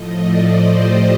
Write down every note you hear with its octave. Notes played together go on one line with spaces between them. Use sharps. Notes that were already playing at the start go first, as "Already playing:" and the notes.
Already playing: A2 F3 A3 D#5
D5
C5
G4